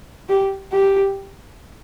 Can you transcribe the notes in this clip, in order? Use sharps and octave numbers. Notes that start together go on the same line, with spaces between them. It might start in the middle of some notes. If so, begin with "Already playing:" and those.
G4
G4